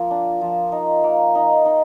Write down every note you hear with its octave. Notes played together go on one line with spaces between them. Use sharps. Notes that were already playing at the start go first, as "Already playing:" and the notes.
Already playing: F3 A#3 A#4
D4
F3
D#4
A#3
D#4
D#4